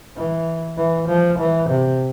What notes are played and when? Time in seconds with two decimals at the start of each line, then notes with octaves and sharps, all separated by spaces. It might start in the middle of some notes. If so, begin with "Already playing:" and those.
0.16 E3
0.77 E3
1.08 F3
1.39 E3
1.70 C3